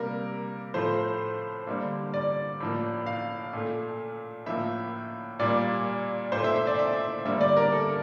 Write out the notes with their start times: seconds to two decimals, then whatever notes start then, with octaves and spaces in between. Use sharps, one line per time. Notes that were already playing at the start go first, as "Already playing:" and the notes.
Already playing: C3 G3 A#3 A#4
0.74 A2 F3 A3 C5
1.67 D3 G3 A#3
2.14 D5
2.60 A2 F3 A#3
3.06 F5
3.53 A#2 A3
4.46 A2 F3 A#3 E5
5.39 A#2 G3 A#3 D5
6.32 A#2 A3 C5
6.44 E5
6.55 E5
6.67 D5
6.79 E5
7.25 D3 G3 A#3 E5
7.41 D5
7.56 A#4
7.72 A4